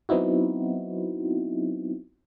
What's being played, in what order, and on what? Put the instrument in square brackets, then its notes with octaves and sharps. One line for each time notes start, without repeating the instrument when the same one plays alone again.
[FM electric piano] F#3 B3 C4 D#4 E4 F#4